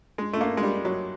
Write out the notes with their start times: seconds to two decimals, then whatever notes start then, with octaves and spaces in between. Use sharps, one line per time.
0.18 G#3
0.33 A3
0.41 A#3
0.57 G#3
0.63 G3
0.85 F#3